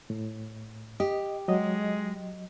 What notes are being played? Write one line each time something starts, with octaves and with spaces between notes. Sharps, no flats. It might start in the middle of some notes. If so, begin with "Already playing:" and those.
A2
G4 D#5
F#3 G#3 D#5